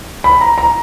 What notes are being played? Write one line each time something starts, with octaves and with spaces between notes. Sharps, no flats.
B5
A#5
A#5